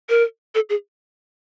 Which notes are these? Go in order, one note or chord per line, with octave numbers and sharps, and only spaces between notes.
A#4
A4
G#4